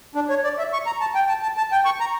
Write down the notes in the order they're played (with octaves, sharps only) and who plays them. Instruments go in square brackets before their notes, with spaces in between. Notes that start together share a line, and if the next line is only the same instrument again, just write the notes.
[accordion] D4
C#5
D5
E5
C#6
A#5
A5
G5
A5
A5
A5
G5
C#6
A#5